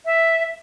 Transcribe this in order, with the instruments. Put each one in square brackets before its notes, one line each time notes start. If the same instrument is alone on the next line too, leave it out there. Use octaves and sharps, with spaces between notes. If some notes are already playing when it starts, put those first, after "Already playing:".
[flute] E5